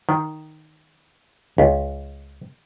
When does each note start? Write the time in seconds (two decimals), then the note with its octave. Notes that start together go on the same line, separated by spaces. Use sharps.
0.09 D#3
1.58 C#2